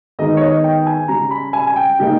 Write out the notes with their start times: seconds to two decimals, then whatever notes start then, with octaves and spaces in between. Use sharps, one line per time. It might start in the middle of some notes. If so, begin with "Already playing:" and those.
0.19 D#3 G#3 B3 D#4 D#5
0.37 C#5
0.41 D#5
0.64 G5
0.86 G#5
1.08 C#3 G3 C#4 A#5
1.31 B5
1.53 G#5
1.67 G#5
1.76 G5
1.99 C#3 G3 A#3 D#4